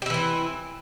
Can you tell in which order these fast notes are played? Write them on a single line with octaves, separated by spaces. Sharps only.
G4 E4 E3 C4